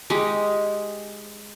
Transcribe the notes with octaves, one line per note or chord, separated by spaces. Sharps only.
G#3 D#4 G4